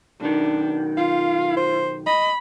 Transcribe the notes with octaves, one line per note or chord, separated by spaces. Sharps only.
B1 D#3 D4
F4 F5
C5
D#5 B5